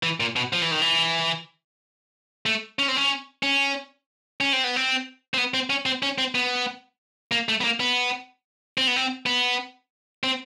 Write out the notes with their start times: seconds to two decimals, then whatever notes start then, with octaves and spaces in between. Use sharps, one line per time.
0.03 E3
0.20 A#2
0.36 B2
0.53 F3
0.62 E3
0.71 D#3
0.82 E3
2.46 A3
2.79 C#4
2.88 C4
2.97 C#4
3.43 C#4
4.41 C#4
4.53 C4
4.64 B3
4.76 C4
5.34 C4
5.38 B3
5.54 C4
5.70 C#4
5.86 C4
6.03 C#4
6.18 C4
6.35 B3
7.32 A#3
7.49 A3
7.61 B3
7.64 A#3
7.80 B3
8.78 C4
8.87 B3
8.96 C4
9.26 B3
10.24 C4